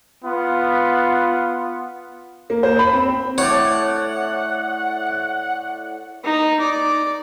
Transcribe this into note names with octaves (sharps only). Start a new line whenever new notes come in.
B3 F4 F#5
A#3
C5
B5
C4
A2 C#5 D5 F#5
D#4
D5